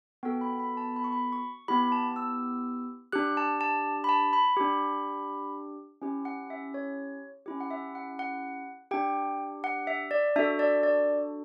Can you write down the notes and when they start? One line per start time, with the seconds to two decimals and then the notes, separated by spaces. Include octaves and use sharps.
0.23 B3 F#4 A4 G5
0.41 B5
0.59 B5
0.77 A5
0.96 B5
1.04 C#6
1.12 B5
1.32 C#6
1.68 B3 E4 G4 B5
1.92 A5
2.16 E6
3.12 D4 G4 F#6
3.37 A5
3.61 A5
4.04 B5
4.09 A5
4.33 B5
4.57 D4 G4
6.02 C#4 E4 G4
6.25 F#5
6.50 E5
6.74 C#5
7.46 C#4 E4 G4
7.60 F#5
7.71 E5
7.95 F#5
8.19 F#5
8.91 D4 G4 G5
9.64 F#5
9.87 E5
10.11 D5
10.36 D4 F#4 A4 E5
10.59 D5
10.83 D5